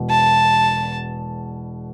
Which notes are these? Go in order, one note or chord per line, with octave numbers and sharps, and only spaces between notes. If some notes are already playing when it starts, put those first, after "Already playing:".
Already playing: E1 E2 B2
A5